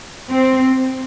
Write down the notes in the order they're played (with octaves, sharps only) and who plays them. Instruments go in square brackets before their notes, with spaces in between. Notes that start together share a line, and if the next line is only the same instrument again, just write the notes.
[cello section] C4